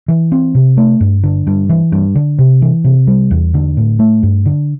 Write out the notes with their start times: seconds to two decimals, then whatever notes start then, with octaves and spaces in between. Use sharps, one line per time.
0.08 E3
0.32 C4
0.55 C3
0.77 A3
1.01 G2
1.24 D3
1.47 G2
1.69 E3
1.92 G2
2.15 D3
2.39 C3
2.62 E3
2.84 C3
3.07 G3
3.31 E2
3.54 D3
3.77 A2
3.99 A3
4.23 G2
4.46 D3